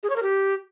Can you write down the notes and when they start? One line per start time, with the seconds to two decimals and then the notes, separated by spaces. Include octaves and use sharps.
0.03 G#4
0.10 C#5
0.16 A#4
0.23 G4